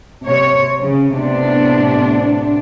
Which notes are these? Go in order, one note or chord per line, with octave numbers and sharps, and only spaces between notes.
C3 C#5
C#3
A2 C3 B3 D4